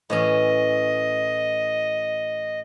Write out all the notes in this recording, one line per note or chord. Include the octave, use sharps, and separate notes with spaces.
A2 E3 C#4 D#5